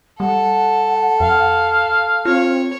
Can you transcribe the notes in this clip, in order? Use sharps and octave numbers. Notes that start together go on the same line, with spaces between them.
G3 A4 F#5
F2 F5
C4 F4 C#5